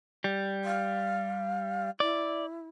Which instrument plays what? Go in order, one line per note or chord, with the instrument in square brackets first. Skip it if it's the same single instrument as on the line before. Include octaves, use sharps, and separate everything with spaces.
[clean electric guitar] G3
[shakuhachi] F5
[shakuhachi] E4 [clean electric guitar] D5